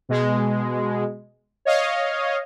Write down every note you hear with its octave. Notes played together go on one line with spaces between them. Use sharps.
B2 G#3
C#5 D#5 F5